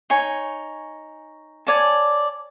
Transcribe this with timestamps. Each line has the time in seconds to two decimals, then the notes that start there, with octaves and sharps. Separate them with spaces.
0.10 D#4 C#5 G#5
1.67 C#5 D5 G#5 A5